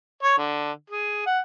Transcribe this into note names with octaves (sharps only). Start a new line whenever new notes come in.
C#5
D3
G#4
F#5